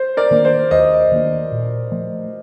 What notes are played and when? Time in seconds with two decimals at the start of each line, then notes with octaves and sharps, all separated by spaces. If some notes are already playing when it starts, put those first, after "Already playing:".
Already playing: C5
0.17 A#4 D5
0.31 D#3 A#3 D4
0.45 C5
0.71 D#2 C5 D#5
1.12 D#3 A#3 D4
1.52 A#2
1.92 F3 A3